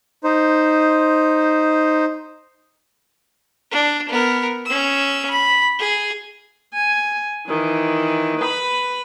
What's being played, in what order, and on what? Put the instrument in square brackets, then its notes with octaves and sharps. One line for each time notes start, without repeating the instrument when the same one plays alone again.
[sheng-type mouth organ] D#4 C5
[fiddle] D4
B3 A#4
C#4 E6
B5
G#4
[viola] G#5
D#3 E3
B4 B5